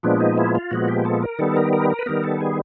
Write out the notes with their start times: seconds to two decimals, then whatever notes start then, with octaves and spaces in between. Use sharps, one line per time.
0.03 A#2 F3 G#3 B3 D4
0.20 D#4
0.38 E4
0.55 F4
0.71 A#2 F3 G#3 B3 F#4
0.88 G4
1.05 A4
1.23 A#4
1.39 D#3 G3 B3 A4
1.56 A#4
1.73 A#4
1.90 A#4
1.99 B4
2.06 D#3 G3 B3 A#4
2.24 A4
2.41 G#4